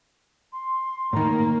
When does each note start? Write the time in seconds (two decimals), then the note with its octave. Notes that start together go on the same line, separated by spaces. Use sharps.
0.52 C6
1.13 A2 D#3 A#3 A#5